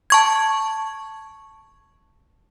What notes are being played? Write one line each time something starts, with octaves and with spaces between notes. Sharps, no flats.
A5 C#6 G#6